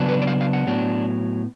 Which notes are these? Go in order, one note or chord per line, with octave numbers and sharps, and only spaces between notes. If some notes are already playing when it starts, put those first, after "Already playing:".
Already playing: C#3 F#3 B3 D4
B4
D5
F5
F5
F#5
A2 F#3 B3 D4